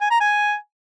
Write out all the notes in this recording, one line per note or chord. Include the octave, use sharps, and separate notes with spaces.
G#5
A#5
G#5